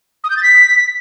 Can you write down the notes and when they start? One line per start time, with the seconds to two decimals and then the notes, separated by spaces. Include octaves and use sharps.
0.24 D#6
0.30 G6
0.36 A6
0.43 B6